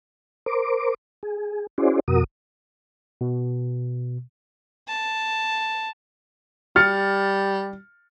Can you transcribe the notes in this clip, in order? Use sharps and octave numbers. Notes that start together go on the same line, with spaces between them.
A#4 C5 D6
G#4
C#4 E4 F#4 G#4 C5 D5
F2 B2 F#4 A#4 D#6
B2
A5
G3 F6 A6 C#7